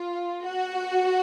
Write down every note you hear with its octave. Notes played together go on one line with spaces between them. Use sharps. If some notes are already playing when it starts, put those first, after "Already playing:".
Already playing: F4
F#4